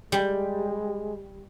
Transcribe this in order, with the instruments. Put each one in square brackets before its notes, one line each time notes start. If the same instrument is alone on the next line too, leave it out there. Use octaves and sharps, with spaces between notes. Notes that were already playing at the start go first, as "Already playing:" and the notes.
[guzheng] G3 [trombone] G#3